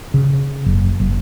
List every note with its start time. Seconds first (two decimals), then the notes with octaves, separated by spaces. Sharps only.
0.14 C#3
0.66 F#1
1.00 F#1